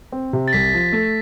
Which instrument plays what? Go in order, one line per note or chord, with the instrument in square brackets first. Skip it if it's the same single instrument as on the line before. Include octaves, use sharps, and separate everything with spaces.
[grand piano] C4
C3
[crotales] A6
[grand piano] C2 [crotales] B6
[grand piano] F3
A3